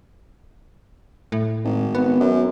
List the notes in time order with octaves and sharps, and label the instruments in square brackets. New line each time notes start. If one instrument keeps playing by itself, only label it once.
[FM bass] A2
[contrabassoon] G#1
[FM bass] B3
[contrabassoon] F#2